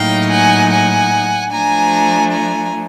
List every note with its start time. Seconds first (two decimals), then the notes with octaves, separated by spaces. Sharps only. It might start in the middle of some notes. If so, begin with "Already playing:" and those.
Already playing: A2 F#3 A#3 D#4 F5 G5
0.31 F#5 G#5
0.71 F#5 G#5
1.52 F3 A3 D4 G#5 A#5
2.32 G#5 A#5